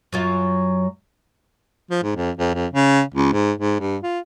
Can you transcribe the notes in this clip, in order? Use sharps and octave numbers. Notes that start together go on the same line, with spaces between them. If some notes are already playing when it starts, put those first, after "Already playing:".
F#2 F#3 F4
F3
G#2
F2
F2
F2
C#3
C#2
G#2
G#2
G2
F4